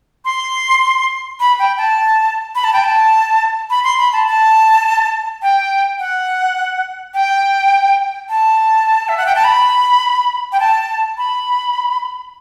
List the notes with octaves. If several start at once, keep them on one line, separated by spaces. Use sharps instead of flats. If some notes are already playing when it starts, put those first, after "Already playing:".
C6
B5
G5
A5
B5
A5
G5
A5
B5
C6
B5
A5
A5
G5
F#5
G5
A5
E5
F#5
G5
A5
B5
G5
A5
B5